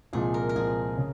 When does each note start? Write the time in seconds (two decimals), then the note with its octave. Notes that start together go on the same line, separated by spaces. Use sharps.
0.13 C2 A#2 F3 G#3 G#4
0.34 A#4
0.49 A#4
0.56 C2 A#2 F3 G#3 G#4
0.98 C#3